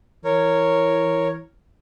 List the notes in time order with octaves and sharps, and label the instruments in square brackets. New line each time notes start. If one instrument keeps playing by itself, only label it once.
[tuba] E3 [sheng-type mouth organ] A#4 C#5